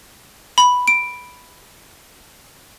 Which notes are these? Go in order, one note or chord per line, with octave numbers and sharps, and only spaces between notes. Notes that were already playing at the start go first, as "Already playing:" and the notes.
B5
D7